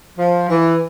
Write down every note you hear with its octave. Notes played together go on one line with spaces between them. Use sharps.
F3
E3